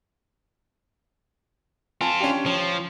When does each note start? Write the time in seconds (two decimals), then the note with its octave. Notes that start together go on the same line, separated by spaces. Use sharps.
2.01 C4 F4 G#5 A5
2.20 C#4 D4 G4
2.46 F3 C#5